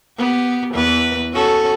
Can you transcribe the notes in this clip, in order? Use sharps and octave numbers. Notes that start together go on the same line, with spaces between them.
B3 G4
E2 E3 B4
C#4 F#4 A4